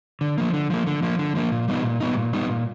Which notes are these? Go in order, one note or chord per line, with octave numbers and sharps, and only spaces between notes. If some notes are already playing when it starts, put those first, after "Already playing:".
D3
F3 A#3
D3
F3 A#3
D3
F3 A#3
D3
F3 A#3
A#2
G3 B3 D#4
A#2
G3 B3 D#4
A#2
G3 B3 D#4
A#2